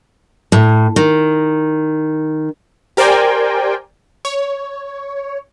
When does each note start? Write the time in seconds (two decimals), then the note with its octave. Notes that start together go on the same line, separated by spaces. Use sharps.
0.52 A2
0.96 D#3
2.97 G4 A#4 C5 D5 G5 G#5
4.25 C#5